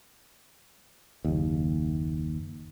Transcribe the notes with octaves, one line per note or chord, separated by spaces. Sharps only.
F#1 D#2